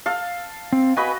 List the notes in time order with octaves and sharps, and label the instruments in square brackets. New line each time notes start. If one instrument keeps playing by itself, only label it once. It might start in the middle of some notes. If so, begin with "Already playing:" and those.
[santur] A4 F5
[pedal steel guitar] C4
[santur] F#4 D#5 B5 [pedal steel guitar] B4 G#5